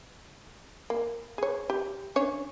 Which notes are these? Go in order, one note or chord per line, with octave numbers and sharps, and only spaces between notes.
A#3
G#4 C#5
G4
C#4 D4 C#5